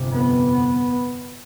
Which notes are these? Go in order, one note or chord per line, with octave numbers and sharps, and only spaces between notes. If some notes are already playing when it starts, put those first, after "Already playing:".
Already playing: G1 F2 C3
B3